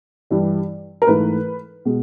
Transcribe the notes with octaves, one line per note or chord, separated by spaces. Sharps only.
G2 E3 G3
A#4
G#2 E3 A3 B4
B2 G#3